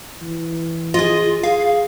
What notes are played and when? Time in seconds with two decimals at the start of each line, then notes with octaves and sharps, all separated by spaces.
0.22 E3
0.94 F4 G#4 D#5
1.43 G#4 F5